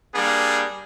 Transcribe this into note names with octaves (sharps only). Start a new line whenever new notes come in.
G3 A#3 D4 G#4